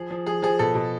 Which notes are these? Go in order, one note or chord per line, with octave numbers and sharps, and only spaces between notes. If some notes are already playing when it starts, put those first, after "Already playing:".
Already playing: F3 G#4
F3
F3 G#4
F3 G#4
B2 A4
B2